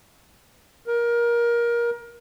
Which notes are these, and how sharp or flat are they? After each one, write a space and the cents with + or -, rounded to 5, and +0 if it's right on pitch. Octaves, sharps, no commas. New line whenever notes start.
A#4 +20